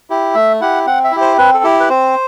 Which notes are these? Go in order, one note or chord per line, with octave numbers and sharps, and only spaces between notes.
E4 G4
A3 E5
E4 G4 F#5
C4 F#5
E5
E4 G4
C5
C4 B4
A4
E4 G4
B4
C4 C5